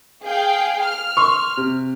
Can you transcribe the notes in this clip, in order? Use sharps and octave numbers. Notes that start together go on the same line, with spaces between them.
G#4 F5 G5
F6
C6 C#6
C3